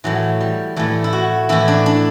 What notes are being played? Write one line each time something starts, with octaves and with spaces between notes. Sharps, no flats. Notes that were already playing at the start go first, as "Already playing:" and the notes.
A2 E3 F#3
G3
A2 E3 A3
E4
F#4
A2 E3 E4
D4
D4